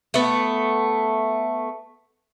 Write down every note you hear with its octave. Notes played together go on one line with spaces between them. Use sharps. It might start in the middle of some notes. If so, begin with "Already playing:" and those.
A3 B3